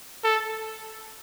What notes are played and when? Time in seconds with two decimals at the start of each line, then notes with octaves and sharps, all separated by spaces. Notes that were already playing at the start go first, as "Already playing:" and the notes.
0.24 A4